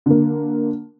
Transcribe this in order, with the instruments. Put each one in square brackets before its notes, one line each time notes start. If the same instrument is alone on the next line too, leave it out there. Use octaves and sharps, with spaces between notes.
[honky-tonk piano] D3 A#3